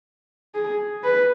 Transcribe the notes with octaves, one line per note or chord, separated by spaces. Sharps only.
G#4
B4